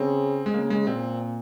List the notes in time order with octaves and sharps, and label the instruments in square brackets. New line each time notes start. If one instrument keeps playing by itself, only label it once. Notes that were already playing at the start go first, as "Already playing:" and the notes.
Already playing: [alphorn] C#3 [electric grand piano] C4
[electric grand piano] G#3
[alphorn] C#3 [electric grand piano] A#3
[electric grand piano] G#3
[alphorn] A#2 [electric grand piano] C4